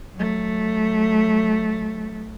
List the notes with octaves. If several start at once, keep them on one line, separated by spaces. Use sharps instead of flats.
F#3 A3